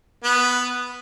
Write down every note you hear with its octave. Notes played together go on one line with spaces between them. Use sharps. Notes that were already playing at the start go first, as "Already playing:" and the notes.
B3